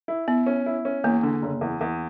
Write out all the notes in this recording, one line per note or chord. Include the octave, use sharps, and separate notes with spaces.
E4
B3 E4
C#4
E4
C#4
E2 A#3
D3
F#1
E2
E2